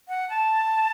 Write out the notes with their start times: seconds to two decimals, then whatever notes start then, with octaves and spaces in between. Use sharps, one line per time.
0.08 F#5
0.30 A5